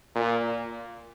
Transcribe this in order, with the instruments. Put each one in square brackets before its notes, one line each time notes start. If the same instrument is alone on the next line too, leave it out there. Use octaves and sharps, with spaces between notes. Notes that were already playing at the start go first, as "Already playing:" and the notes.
[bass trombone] A#2